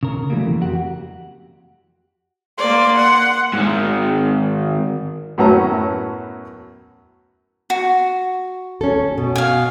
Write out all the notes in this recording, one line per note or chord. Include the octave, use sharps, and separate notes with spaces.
C#3 A#4
E3 F#3 G3 A3 A#3
F2
F#4 G4 F#5
A#3 D5 C6
F#5
G#2 D#3
F#2 A2 F#3 B3 C#4 A#5
F#4
C#4 A4
B2
F5 G#5